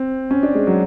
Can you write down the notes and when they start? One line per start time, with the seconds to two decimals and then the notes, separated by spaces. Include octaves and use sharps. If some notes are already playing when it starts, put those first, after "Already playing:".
Already playing: C4
0.31 C#4
0.43 D4
0.55 G#3
0.67 F#3